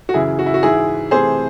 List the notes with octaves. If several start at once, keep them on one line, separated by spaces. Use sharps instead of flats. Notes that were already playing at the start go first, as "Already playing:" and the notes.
F#4
F#2 C#3 E3 E4 G#4
F#4
E4
F#4
G#2 E3 G#3 E4 G#4
C3 E3 A3 G#4 C5